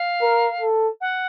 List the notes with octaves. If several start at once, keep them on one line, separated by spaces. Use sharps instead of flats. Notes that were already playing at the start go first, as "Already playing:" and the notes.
Already playing: F5
A#4
A4
F#5